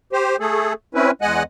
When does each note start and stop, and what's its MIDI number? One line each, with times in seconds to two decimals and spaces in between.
0.13 0.36 67
0.13 0.36 72
0.40 0.73 57
0.40 0.73 68
0.40 0.73 69
0.95 1.11 60
0.95 1.11 61
0.95 1.11 64
0.95 1.11 71
1.22 1.43 40
1.22 1.43 56
1.22 1.43 75
1.22 1.43 78
1.22 1.43 80
1.22 1.43 90